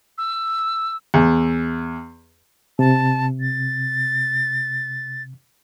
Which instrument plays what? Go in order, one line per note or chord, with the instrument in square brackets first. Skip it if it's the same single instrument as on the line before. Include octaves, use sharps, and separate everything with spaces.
[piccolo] E6
[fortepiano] E2
[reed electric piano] C3 [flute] A5
[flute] A6